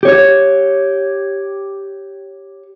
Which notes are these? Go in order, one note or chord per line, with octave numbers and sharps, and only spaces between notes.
G4 C#5